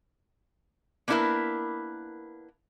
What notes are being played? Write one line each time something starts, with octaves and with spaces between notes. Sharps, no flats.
A#3 B3 D4 E4 A#4 B4